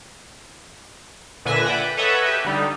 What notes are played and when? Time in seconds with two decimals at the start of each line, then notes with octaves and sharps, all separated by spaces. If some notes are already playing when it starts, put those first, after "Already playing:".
1.45 A#2 D3 B4 E5 G#5 A#6
1.65 D5 E5 F#5 G5 D6
1.81 B4
1.97 A4 B4 C#5 D#5 E5 F#5
2.24 G4 B4 E5
2.44 D3 G3 D#4